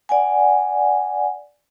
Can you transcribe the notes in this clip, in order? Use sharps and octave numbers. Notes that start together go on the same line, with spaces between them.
D5 F#5 G#5